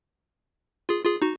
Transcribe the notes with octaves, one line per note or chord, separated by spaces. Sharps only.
F4 G#4
F4 G#4
D#4 F#4